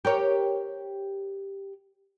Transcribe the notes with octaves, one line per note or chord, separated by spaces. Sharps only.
G4 A#4 C#5